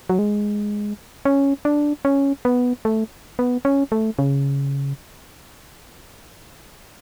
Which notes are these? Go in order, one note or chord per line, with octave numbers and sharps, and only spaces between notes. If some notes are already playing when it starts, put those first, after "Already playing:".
F#3
G#3
C#4
D4
C#4
B3
A3
B3
C#4
A3
C#3